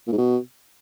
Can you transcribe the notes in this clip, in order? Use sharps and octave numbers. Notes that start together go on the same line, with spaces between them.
A#2
G#2
B2